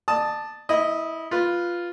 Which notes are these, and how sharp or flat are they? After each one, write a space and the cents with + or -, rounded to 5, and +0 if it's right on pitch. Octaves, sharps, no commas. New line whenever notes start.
D5 +40 A5 +0 D#6 +10
E4 -20 D#5 +0
F4 +0 B4 +0